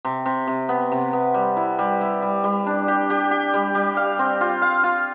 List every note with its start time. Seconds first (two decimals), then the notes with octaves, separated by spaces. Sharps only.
0.05 C3
0.26 C3
0.47 C3
0.69 B3
0.92 C3
1.13 B3
1.34 G3
1.57 E4
1.79 G3
2.01 E4
2.22 G3
2.44 G3
2.66 D4
2.88 G4
3.10 G4
3.31 G4
3.54 G3
3.75 G3
3.97 F5
4.19 C4
4.41 F4
4.62 F5
4.83 F4